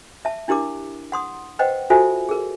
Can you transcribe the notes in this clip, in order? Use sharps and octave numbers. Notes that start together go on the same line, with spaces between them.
E5 A5
D4 E4 G4 A#4 D6
F#5 C6 D#6
B4 C5 D#5 F#5 G5
F4 F#4 A4 C5 E5 G#5
G#4 A#4